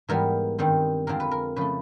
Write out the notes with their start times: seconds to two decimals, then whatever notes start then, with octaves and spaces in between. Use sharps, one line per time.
0.09 G#2 E3 G3 B3 A#4
0.59 G2 D#3 G3 C4
1.07 F2 D3 F3 G#3 C4 A#4
1.20 B4
1.31 A#4
1.56 C#3 F3 A3 B4